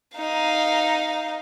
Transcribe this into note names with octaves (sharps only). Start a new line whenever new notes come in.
D#4 F5